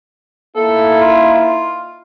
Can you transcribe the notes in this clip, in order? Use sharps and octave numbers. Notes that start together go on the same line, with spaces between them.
A#3 D#4 E4 A4
F4
F4